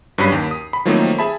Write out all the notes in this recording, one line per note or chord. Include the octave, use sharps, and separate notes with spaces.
G2 F#3 C#4 B5 B6 C7
D#2
D#6
B5
D#3 F3 F#3 A3 A#3 C4
G#4 E5 A5 B5